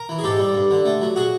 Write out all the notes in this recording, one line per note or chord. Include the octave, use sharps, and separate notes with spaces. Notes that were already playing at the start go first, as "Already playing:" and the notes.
Already playing: A#4
E3
G#4
G#2 G4 A4
G3
G2
D3
A3
F#3
F#4 G#4